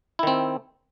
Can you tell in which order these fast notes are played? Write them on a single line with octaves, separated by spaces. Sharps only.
E4 D#3 C4